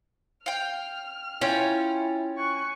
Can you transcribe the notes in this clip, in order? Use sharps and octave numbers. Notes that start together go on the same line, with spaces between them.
F5 G5 F6
C#4 E4 F4 G5
G#5 C#6 F#6